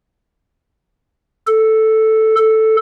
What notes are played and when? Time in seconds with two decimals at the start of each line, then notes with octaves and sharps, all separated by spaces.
1.47 A4
2.37 A4